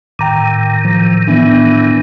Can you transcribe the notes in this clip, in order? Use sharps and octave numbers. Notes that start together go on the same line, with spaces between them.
A2 D#3 G5 A#5 D6
F3
E3 B3 D4